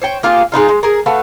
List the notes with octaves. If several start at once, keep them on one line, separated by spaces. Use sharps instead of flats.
C5 C#5 G5
A#3 F4 G4 G#4
G#3 B3 D#4 F4
G#3
G#4 A#4
A3 F#4 B4 F5